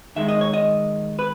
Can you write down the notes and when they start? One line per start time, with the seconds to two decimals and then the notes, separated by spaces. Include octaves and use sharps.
0.15 D#2 D#3 G#3 E5
0.28 D#5
0.41 C#5
0.53 D#5
1.19 B4